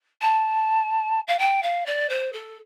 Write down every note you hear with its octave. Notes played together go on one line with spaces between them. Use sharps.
A5
F5
G5
F5
D5
C5
A4